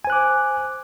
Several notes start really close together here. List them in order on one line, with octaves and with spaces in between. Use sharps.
G#5 C5 F#6 D6